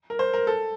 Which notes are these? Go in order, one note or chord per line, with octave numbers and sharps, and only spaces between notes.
A#4
C5
A#4
A4